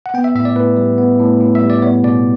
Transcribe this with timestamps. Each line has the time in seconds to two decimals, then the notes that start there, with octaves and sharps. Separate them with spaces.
0.06 F#5
0.14 B3 G5
0.24 E5
0.35 A2 E5
0.45 D5
0.56 A2 B4
0.77 G3
0.98 B3
1.19 A2
1.41 A2
1.55 E5
1.61 G3
1.70 D5
1.82 B3 C#5
2.04 B2 D5